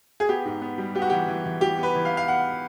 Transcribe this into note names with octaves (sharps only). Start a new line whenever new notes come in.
G#4
B3 G4
G#2
B3
G3
B3 G4
F#4
E3 G4
E3
E3
E3 G4
B3 B4
E3
F5
B3
F5
B3 F#5